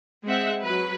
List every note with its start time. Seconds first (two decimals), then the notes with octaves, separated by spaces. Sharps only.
0.25 G#3 C4 E5 F#5
0.63 F#3 B4